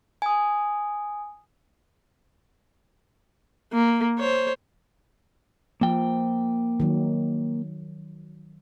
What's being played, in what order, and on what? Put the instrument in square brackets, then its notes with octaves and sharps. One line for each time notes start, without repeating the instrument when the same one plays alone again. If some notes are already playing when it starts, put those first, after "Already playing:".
[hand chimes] G#5 D#6
[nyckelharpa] A#3
C5 C#5
[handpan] F3 [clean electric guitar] A#3 G5
[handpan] D#3 F#3